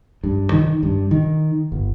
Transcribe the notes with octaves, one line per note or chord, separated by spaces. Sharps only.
G2
D#3
G2
D#3
G1